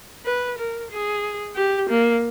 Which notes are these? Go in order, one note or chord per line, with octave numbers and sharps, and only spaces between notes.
B4
A#4
G#4
G4
A#3